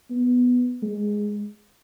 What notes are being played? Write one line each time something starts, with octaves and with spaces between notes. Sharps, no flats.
B3
G#3